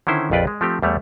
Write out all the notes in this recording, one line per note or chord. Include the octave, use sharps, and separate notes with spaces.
D3 D#3 C#4 E4 C5
A#1 F2 F4 B4 D5 G5
G#3
F3 A3 C4 G4
E2 G3 A3 C#5